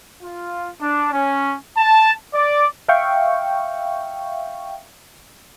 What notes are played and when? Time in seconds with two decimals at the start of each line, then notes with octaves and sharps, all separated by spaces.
0.23 F4
0.81 D4
1.13 C#4
1.77 A5
2.34 D5
2.88 E5 F5 G5 C#6